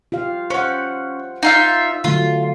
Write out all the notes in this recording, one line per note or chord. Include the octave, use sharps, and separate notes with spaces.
F4 G4 F5
C#4 C5 F#5
D#4 F4 E5
D3 F#3 A3 F4